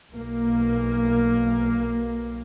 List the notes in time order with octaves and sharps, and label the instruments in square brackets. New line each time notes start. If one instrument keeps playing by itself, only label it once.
[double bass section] B1 A#3